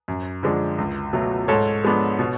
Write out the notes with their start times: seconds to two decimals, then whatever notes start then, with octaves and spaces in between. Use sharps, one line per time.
0.08 F#2
0.43 D3 F3 G#3 D4
0.78 C#2
1.13 B2 F#3 A3
1.48 G#2 A4 C#5
1.83 F3 G#3 B3 D4
2.19 B2